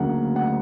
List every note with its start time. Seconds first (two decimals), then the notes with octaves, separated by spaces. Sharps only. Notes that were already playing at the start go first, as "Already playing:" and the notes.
Already playing: D2 C#3 F#3 A#3 F#5
0.36 F#5